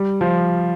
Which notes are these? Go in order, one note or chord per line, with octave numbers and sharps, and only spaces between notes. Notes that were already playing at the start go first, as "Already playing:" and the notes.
Already playing: G3
F3